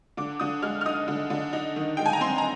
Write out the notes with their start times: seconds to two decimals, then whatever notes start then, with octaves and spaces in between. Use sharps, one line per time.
0.17 D3 D6
0.40 D3 D#6
0.62 G#3 F6
0.81 F6
0.86 D#4 D#6
1.08 D3
1.30 D3
1.53 D#4
1.76 D#3
1.97 G#3 G5
2.06 G#5
2.13 A#5
2.21 C4 C6
2.38 A#5